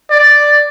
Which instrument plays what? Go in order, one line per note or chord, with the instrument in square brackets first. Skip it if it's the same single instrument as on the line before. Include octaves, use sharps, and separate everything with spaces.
[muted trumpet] D5